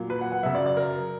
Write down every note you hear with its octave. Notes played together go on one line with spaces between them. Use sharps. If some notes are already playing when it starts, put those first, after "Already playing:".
Already playing: A#2 F#3 A#3
B4
F#5
F#5
F#2 C#3 F#3 E5
D5
D5
A#4